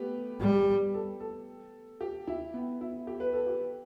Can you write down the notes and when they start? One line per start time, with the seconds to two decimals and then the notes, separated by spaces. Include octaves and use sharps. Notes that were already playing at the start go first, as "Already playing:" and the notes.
Already playing: A3 B3 G4 B4
0.40 G3
0.94 A4
1.20 A4
2.01 G4
2.27 E4
2.54 B3
2.81 E4
3.07 G4
3.20 B4
3.33 A4
3.47 G4